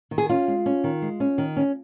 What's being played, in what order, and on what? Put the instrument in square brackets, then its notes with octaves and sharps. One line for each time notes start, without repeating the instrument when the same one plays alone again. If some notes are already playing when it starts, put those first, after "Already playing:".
[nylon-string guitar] D#3
G#4
C#4 F4
G#3
C#4
D#3
G#3
C#4
D#3
C#4